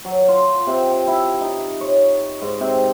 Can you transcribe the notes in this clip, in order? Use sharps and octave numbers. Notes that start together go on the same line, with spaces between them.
F#3
F4
C3
G5
E4
D#4
C#5
G#2
C3